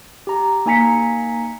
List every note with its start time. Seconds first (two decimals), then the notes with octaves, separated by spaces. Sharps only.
0.27 G4 A#5
0.66 A#3 D#4 G#5 A#5 B6 C#7